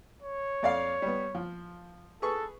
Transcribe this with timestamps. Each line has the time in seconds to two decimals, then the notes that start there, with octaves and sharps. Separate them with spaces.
0.22 C#5
0.63 F2 D5 F5
1.02 G3 B3
1.35 F3
2.22 G#4 A4 B4 C#6